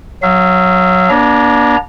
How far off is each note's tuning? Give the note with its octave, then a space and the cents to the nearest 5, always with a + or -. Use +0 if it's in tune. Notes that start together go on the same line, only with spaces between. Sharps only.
F#3 -10 F5 -45
A#3 +45 D4 -15 A#5 -10